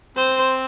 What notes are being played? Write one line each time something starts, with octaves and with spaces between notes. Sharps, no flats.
C4 C5